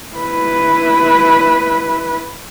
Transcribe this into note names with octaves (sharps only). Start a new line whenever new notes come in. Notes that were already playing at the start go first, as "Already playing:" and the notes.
E4 B4